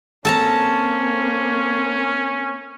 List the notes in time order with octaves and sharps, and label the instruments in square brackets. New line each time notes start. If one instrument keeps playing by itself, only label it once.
[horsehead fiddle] A#3 C4 [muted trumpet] C#4 [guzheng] A4 A5 A#5